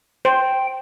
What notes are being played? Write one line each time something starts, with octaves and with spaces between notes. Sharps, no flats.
C5 G5